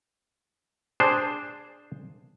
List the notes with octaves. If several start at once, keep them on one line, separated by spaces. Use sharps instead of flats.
D4 G#4 C5